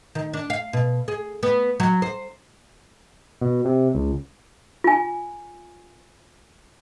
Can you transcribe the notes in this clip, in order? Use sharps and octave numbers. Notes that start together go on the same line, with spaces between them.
D#3
D4
F5
B2
G#4
B3
F#3
C5
B2
C3
C#2
F4 G#5